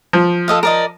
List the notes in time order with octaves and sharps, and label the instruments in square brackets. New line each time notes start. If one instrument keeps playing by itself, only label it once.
[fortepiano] F3
[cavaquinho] A4 D#5 F5
A#4 D5 D#5